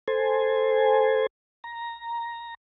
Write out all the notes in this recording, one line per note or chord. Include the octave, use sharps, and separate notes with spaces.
A4 C5 G#5
A#5